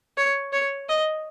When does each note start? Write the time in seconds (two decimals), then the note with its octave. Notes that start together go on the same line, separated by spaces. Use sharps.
0.18 C#5
0.53 C#5
0.89 D#5